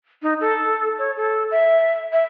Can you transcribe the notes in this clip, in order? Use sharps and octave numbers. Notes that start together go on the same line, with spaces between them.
D#4
A4
C#5
A4
E5
E5